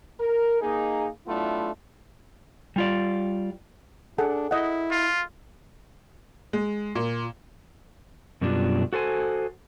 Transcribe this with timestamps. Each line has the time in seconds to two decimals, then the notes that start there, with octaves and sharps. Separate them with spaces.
0.20 A#4
0.61 A#3 D#4 G#4
1.27 F#3 A3 B3 D4 E4 F4
2.76 G3 F4 D5
4.18 D4 G#4 A4 F#5
4.51 E4 D#5 F#5
4.91 F4
6.53 G#3
6.95 A#2
8.41 F#2 B2 G3 D4 F4 F#4
8.93 F#4 A4 C5 G#5